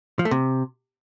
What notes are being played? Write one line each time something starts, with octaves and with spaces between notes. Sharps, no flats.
F3
A3
C3